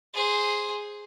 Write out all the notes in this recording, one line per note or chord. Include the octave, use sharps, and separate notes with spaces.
G#4 C5